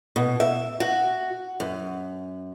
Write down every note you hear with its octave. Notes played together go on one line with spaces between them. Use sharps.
B2
E5
F#4
F#2